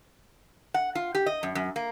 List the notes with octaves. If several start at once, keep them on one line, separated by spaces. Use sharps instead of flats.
F#5
F4
G4
D#5
F#2
F#2
A#3